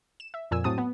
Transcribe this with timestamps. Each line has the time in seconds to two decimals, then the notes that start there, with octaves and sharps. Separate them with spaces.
0.20 E7
0.34 E5
0.51 F2 A#2 G#5 E6
0.64 A2 F#3 C4 A5 D#6
0.78 B3